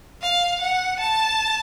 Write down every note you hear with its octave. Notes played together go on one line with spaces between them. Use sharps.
F5
F#5
A5